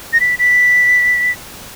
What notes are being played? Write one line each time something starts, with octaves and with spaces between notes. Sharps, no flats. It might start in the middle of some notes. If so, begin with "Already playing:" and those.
A#6
B6
B6